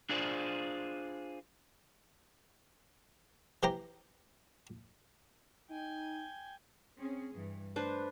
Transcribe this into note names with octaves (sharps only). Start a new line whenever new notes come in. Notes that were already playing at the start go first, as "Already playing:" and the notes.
D4 F4 G#4 C5 D5
E3 G4 C5 A#5
D#4 G5 G#5
C4 C#4 G#4
G2 E3
A3 D4 B4 C5